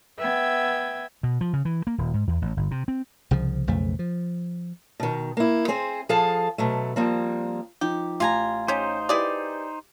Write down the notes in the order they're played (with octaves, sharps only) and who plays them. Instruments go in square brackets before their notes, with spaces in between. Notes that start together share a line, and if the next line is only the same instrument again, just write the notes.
[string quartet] B3 E5 G5 G#6
[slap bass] B2
F3
C#3
E3
A#3
D#1
G#2
E2
A1
G1
C3
C4
C2 C#3 F3
B1 F2 C#3 A3
F3
[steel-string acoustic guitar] B2 D#3
A#3 E4
C4 G#4 C5
F3 G#4 A4 F5 A5
B2 F#3 A3
F3 G3 A#3 C4
[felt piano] F3 D#4 [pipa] G4
[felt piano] A1 [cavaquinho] F4 G#5 A#5
[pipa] C#4 G4 [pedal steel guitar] D#4 C5
[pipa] E4 G#4 D5 [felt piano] G4 B4